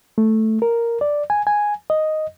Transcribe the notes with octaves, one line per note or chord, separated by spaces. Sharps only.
A3
A#4
D5
G#5
G#5
D#5